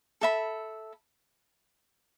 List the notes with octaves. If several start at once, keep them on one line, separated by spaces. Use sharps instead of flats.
A4 E5 B5